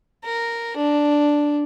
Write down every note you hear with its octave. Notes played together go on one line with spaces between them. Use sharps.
A#4
D4